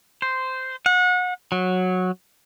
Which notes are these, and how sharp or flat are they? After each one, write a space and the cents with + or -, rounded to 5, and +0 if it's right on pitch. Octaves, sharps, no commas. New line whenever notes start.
C5 -10
F#5 -30
F#3 -10